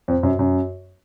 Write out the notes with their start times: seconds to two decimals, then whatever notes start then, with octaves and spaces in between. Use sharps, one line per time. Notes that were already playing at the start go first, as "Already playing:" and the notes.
0.08 F2
0.23 F#2
0.39 F#2